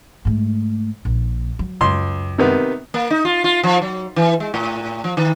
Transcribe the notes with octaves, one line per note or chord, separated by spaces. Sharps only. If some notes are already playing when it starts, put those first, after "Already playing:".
G#2 A3
A#1 A#2
F#3
C#2 F#2 C6
C3 D#3 B3
A#3
D#4
F4
F4
F3
F#3
E3
G#3
A2
F3
D#3